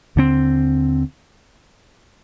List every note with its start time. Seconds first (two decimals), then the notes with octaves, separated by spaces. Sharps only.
0.16 D#2 D3 G3 C4